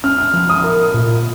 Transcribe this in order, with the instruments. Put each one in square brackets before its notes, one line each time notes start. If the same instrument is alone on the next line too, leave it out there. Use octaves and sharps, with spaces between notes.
[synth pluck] C#4 [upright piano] F6
[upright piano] F6
[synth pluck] F3 [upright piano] F6
[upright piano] D#6
[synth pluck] A#4
A#2